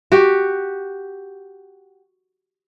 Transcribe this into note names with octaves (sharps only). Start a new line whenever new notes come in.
F#4 G4